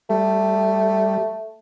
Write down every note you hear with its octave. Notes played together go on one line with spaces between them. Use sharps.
G3 A3